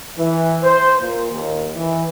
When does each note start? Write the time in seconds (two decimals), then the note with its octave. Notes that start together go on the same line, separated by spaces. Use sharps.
0.17 E3
0.63 C5
1.00 A#2
1.32 D#2
1.74 E3